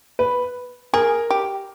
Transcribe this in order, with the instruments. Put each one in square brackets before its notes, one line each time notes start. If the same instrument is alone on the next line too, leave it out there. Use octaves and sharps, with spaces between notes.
[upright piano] B4
[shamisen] G#4 [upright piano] A#4
[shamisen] G4